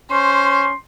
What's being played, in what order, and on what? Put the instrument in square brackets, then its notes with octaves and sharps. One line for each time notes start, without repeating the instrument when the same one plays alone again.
[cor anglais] C#4 [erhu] C5 [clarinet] C6